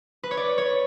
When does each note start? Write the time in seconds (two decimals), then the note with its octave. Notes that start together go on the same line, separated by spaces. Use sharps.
0.23 B4
0.31 C#5
0.37 D5
0.58 C#5